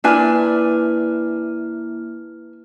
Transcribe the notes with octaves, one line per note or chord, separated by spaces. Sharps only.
A#3 D4 E4 B4 G#5 F6